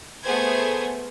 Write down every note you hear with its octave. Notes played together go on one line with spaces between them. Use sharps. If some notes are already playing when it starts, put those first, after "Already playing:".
A3 B3 G#4 C5 G#6